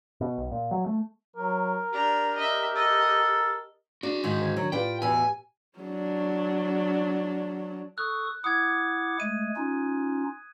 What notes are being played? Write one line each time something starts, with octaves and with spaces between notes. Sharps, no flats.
B2
B1
A#2
F#3
A3
F#3 A#4
D4 G4 A#5
D#5 E5
A4 D#5
D4 F#4 G#4
G#2 D#3
D3 C5 G#6
C3 D#3 F#3 D4
A2 F4 G4 B4 D5 G5
E2 B2 G#5
F#3 D4
A4 C#6 D#6 F#6
E4 F#5 D6 D#6 G#6
G#3 A3 D#7
C#4 D#4 F4